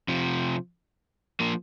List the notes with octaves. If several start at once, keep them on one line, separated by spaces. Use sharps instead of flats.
C3 F3
F3 A#3